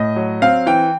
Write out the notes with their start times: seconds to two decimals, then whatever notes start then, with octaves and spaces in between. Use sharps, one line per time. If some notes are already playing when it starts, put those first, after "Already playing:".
Already playing: A2 D#5
0.16 F#3
0.42 C4 F5
0.66 E3 G5